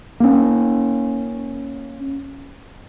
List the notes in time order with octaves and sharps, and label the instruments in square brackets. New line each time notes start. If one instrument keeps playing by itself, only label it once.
[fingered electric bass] A#3 C#4